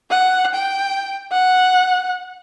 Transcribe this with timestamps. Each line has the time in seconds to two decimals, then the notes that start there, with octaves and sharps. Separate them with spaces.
0.10 F#5
0.54 G5
1.32 F#5